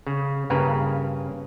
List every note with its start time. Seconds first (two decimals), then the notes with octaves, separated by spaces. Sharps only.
0.07 C#3
0.50 G2 C#3 A#3 A#4 B4 G#5